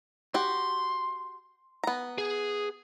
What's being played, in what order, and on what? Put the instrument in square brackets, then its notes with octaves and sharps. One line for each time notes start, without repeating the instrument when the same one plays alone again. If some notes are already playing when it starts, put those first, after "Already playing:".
[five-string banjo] F#4 G4 [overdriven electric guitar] C6
[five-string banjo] B3 A#5
[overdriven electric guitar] G#4